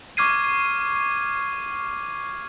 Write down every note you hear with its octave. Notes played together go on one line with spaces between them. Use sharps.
C#6 D6 F6 G#6 C7 D#7